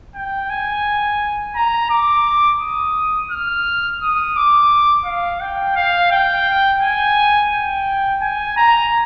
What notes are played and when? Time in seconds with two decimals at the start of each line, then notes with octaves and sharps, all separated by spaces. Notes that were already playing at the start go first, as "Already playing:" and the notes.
0.15 G5
0.50 G#5
1.56 A#5
1.91 D6
2.61 D#6
3.31 F6
4.01 D#6
4.36 D6
5.06 F5
5.41 G5
5.76 F5
6.11 G5
6.82 G#5
7.52 G5
8.22 G#5
8.57 A#5